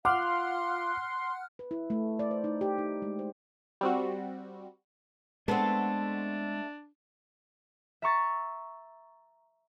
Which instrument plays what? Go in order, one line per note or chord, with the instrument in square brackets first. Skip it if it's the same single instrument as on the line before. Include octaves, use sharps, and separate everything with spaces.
[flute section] F4 F5 [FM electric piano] F#5 F6 F#6 [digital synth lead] C6 [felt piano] D6
[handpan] B4
E4
A3
D5
C5
D#4
G4
D#4
G#3
C5
[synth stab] G3 C4 F#4
[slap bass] G#3 [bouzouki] A3 A4 [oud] B3 C4 [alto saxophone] D4
[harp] E5 A#5 C#6 A6